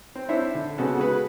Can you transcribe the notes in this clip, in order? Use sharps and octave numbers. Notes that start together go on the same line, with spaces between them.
C4
D4 E4 C5 C#5 E5
D3
C#3 G#3 B3 F#4 A4
F#4 G#4 B4